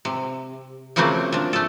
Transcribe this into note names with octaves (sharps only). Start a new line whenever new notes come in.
C3
C#3 F3 F#3 A3 A#3 C4
F3 D4
A3 A4